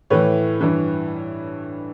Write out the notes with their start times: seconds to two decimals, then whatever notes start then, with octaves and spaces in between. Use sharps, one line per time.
0.10 A2 E3 B4 C#5
0.61 G2 E3